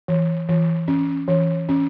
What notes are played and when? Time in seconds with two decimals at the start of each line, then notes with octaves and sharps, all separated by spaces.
0.08 E3
0.49 E3
0.88 C#4
1.28 E3
1.69 C#4